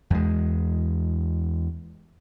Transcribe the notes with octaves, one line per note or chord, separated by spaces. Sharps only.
E2 G#3